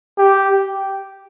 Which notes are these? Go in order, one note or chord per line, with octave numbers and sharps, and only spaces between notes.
G4